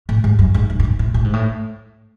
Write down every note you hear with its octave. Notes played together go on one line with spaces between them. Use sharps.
A2
G#2
F#2
G#2
G2
A2
G#2
A2
A2
G#2
A2